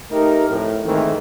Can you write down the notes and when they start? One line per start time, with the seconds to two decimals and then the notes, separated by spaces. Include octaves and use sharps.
0.11 A3 D#4 G4 A#4
0.49 F2 A2
0.85 G#2 D#3 E3 A3 A#3 C4